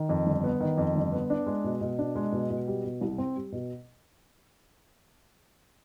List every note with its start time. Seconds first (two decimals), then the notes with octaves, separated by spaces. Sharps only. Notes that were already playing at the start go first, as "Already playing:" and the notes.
Already playing: D#3
0.09 F2
0.27 G1
0.44 B3
0.60 D#3
0.78 F2
0.95 G1
1.12 B3
1.30 D4
1.46 G#3
1.64 B2
1.81 B2
1.98 D4
2.16 G#3
2.32 B2
2.50 B2
2.68 G3
2.84 B2
3.01 C2
3.18 C4
3.36 G3
3.52 B2